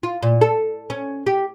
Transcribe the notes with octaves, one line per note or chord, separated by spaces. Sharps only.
F4
A#2
A4
C#4
G4